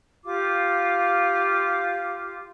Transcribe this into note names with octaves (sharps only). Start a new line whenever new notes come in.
F4 G4 F5 D6